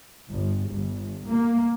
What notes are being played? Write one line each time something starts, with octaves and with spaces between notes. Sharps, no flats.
G1
G1
A#3